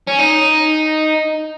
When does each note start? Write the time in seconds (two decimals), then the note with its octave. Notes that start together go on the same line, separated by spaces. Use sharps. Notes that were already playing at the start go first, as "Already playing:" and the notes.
0.08 C#4
0.19 D#4